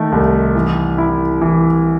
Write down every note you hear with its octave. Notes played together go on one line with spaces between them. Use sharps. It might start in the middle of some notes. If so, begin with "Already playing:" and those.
Already playing: D#3 A3
C2
E3
E4
E3